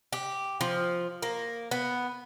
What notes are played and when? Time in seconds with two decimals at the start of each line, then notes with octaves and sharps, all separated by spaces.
0.13 G4
0.61 F3
1.22 A#3
1.71 B3